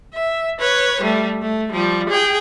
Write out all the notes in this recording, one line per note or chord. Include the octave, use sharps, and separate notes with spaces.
E5
B4 C#5
G3 A3
A3
F3 G3
G#4 G5